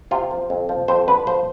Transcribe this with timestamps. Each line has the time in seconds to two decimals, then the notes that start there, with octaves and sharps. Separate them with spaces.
0.11 C3 F4
0.31 F3
0.50 F2
0.69 F3
0.88 F2 C5
1.08 D3 B4
1.27 F3 C5